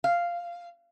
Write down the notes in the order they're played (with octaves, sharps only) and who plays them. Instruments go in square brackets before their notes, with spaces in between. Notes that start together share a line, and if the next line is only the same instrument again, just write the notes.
[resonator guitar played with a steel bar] F5